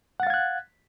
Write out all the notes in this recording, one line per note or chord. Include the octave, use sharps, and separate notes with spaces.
F5 F#5 F#6 G#6 A6